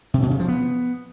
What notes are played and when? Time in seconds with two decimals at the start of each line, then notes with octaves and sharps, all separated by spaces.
0.14 C3
0.22 B2
0.31 C#3
0.40 F3
0.48 B3